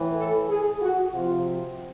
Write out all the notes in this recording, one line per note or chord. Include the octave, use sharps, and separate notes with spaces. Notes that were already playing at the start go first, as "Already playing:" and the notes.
Already playing: A2 E3
A4
G#4
F#4
C3 F3 F4